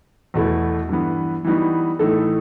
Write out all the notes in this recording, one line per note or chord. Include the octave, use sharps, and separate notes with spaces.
E2 B2 A3 E4 A4
G2 E3 B3
E3 G3 B3 D#4 F#4
A2 E3 A3 D#4 A4